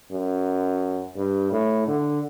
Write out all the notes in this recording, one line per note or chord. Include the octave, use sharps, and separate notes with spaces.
F#2
G2
A2
D3